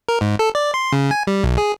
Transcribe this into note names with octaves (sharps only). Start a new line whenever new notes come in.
A#4
G#2
A4
D5
C6
C#3
G#5
G3
B1
G#4